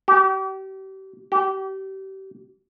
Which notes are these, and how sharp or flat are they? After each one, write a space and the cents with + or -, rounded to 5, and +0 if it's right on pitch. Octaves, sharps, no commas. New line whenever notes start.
G4 -35
G4 -30